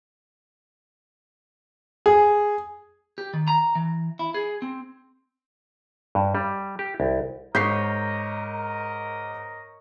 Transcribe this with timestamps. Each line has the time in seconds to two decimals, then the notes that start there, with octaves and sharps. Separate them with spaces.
2.06 G#4
3.18 G4
3.34 D#3
3.48 A#5
3.75 E3
4.19 E4
4.34 G#4
4.62 C4
6.15 G2
6.35 G3
6.79 G4
7.00 C2
7.55 G#2 A#4 C#5 D#5 G6 B6 C7